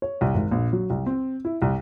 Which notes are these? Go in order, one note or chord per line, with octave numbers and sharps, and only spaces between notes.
C#5
C2
G#1
A#1
F#3
C2
C4
E4
C2